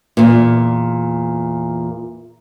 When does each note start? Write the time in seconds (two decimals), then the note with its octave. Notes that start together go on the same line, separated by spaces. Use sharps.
0.17 E2 A#2